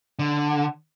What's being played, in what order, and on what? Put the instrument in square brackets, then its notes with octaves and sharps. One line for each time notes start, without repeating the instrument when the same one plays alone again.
[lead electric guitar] D3